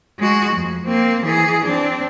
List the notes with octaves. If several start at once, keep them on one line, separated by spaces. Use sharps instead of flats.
G#3 F#4
F2
A#3 C4
E3 G#4
C4 D4